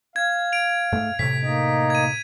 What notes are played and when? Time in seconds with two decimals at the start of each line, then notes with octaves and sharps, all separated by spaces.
0.16 F5 G#6
0.52 D7 F7
0.93 G#2 A3
1.19 A2 C3 B6
1.43 A#3 D#4 D#5
1.90 G#6 D#7